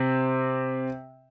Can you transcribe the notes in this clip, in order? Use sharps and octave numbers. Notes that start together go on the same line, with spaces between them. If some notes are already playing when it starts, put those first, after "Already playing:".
Already playing: C3 C4